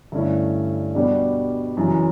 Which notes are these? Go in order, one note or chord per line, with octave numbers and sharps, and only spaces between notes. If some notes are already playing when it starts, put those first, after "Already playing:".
G2 D3 A3 C#4 E4
B2 G3 B3 D4
F#2 C#3 E3